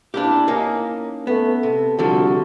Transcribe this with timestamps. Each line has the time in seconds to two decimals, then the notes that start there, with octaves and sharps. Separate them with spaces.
0.14 A#3 D4 E4 G4 A5
0.48 A#3 C#4 D#4
1.27 A3 B3
1.63 C3 A4
1.99 C2 D3 F3 F#4 A4